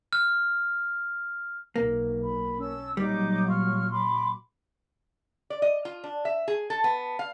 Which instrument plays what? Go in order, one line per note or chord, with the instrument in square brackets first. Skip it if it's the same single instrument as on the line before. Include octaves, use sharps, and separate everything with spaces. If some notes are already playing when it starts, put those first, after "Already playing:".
[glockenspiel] F6
[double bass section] B1 [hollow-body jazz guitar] A#3
[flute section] B5
C#4 A4 E6
[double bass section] A#2 F#3 [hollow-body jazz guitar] G3 [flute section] D#4 D6
[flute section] F4 C#6 F6
B5 C6 D6
[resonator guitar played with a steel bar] D5
D#5
F4
D4
E5
G#4
A4
B3
F5